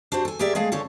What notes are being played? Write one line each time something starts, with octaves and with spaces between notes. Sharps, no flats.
D4 F#4 G4 C5
A4 G#5
G4 G#4 A#4 D5 E5 G5
G#3 A3 G#4 F5 G5
D3 C#4 A4 C5 C#5